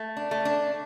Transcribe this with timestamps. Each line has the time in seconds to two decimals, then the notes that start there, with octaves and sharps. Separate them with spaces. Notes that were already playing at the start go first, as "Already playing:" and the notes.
Already playing: A3
0.17 D4
0.31 A3
0.45 D4